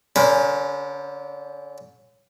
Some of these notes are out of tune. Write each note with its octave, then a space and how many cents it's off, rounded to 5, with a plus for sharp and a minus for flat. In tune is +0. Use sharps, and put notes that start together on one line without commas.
D3 -25 C#4 +0 A#4 +35